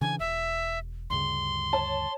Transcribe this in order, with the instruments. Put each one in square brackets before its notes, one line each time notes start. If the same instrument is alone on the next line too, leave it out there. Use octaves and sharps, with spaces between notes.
[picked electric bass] C#3 E3 D4 [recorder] G#5
[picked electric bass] E1 [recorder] E5
[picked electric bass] D2 G2 C#3 [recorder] C6
[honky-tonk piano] C#5 A5